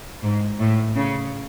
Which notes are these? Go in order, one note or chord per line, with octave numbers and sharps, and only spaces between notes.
G#2
A2
C#3